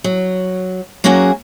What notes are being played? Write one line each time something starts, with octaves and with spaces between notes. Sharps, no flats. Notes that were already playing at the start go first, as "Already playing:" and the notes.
F#3
F#3 A#3 C#4 F#4 G#4